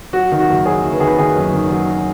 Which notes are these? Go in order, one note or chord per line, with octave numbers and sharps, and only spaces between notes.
F#3 F#4
D#3
F#4
F#1
F#3 G#4
F#1
B4
D#3 G#4
B4
D#3 G#4
F#2
D#3
F#3